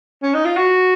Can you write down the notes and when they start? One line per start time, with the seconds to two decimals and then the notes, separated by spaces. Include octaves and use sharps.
0.23 C#4
0.34 D#4
0.45 F4
0.57 F#4